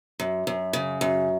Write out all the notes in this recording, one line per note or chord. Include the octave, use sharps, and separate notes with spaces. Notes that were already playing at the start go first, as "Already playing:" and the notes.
F#2
F#2
C#3
F#2